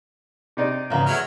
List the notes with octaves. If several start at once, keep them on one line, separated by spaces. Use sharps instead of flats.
C3 D#4 D5
G#2 C#3 E3 F#3 A#3 B3
F#3 A3 B3 E4 G#4 F6